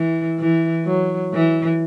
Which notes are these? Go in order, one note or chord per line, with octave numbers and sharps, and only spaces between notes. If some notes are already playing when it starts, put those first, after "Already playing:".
Already playing: E3
E3
F#3
E3